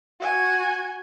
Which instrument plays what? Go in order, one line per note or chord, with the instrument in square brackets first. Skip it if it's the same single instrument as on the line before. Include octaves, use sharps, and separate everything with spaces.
[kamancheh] F#4 G#5